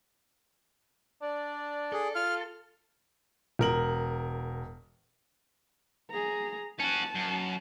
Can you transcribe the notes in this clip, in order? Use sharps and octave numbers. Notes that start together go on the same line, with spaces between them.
D4 D5
G#4 A4
F4 F6
E1 A#4 F#7
G#4 A#5
C#4 F#4 A5
F#2